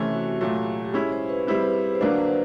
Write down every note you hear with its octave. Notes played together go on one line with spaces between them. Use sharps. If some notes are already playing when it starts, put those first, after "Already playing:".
Already playing: C3 E3 A3 C#4 G4
F#4
A#2 F#3 A3
G4
G#3 C#4 E4 G#4
C5
B4
G3 C4 E4 G4 C5
B4
C5
C5
D3 F#3 A#3 D4 B4
C5
B4